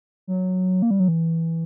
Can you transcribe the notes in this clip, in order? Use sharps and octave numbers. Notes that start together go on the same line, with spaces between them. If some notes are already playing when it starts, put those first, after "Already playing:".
F#3
A#3
G3
F#3
E3